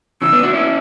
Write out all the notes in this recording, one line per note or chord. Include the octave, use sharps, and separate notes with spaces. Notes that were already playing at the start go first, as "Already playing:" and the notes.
C#3 E3 E6
B3 D4
D4 F#4
C#4 E4